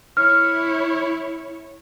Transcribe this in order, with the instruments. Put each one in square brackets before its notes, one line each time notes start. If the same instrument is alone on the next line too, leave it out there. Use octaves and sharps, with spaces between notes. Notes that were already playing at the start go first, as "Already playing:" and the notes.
[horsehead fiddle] E4 C#5 [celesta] F6